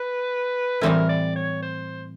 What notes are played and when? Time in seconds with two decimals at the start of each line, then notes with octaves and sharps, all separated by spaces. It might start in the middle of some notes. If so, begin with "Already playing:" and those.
Already playing: B4
0.81 A2 E3 G3 C4 E4 A#4
1.09 D5
1.36 C#5
1.62 C5